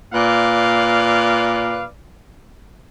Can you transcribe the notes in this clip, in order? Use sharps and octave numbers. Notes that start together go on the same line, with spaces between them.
A#2 B4 D5 F5